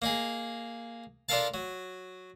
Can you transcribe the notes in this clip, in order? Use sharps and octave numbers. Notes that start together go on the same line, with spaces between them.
A#3 D#4 G#4
D4 F4 A4 A#4 F5 A5
F#3